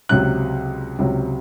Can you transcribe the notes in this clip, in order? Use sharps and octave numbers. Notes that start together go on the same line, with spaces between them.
C#2 C3 F#3 F#6
C#2 C3 F#3